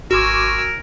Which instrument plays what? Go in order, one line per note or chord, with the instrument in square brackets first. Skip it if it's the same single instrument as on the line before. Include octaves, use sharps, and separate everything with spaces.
[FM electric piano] G#1 C6 D6 [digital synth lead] F#4 [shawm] A#4 [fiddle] G#5 E6